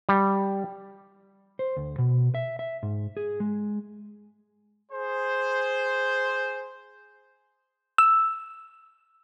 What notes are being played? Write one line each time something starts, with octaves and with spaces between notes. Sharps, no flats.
G3
C5
D2
B2
E5
E5
G#2
G#4
G#3
G#4 C5
E6